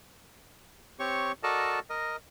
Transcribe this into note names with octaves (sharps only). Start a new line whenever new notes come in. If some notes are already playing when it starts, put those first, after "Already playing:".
C4 G4 C#5 C#6
F#4 A4 A#4 D5 D#5 A5
A#4 D#5